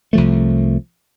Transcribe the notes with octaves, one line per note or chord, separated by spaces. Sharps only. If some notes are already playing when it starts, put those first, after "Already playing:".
C2 F3 A3